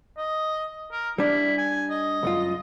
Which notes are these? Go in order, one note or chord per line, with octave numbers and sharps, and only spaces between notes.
D#5
A#4
G3 D4 E4
G#5
D#5
C#2 F#2 F4